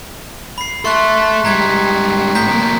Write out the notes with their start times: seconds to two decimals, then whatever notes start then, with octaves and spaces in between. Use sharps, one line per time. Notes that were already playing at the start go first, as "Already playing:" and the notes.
0.58 B5 C7
0.85 A4 E5 C6 C#6 F#6
1.45 G#2 G3 A#5 G#6 B6
2.35 A2 A#5 G6 B6
2.48 C3 A#3